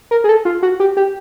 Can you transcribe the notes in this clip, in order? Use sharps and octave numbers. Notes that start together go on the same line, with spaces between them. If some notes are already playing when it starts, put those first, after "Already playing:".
A#4
G#4
A4
F4
F#4
G4
G4